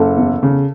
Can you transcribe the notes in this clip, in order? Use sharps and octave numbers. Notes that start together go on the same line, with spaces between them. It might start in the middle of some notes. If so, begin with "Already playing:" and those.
Already playing: F#1 A4
E2
C#3